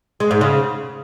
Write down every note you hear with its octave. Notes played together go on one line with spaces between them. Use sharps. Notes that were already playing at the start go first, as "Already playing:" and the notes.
G#3
G#2
C#3